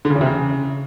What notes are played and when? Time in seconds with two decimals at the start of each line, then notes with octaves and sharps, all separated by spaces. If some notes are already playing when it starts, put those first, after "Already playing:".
0.05 D3
0.10 C#3
0.15 E2
0.21 C3
0.26 C#3